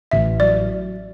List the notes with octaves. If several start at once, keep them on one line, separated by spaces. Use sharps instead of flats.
A1 E5
F#3 D5